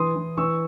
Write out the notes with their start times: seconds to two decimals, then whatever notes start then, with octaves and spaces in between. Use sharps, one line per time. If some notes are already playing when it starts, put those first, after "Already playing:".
Already playing: E3 C6 D#6
0.16 E3
0.37 E3 C#6 E6